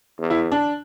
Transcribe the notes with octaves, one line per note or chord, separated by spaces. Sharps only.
E2
E4
D4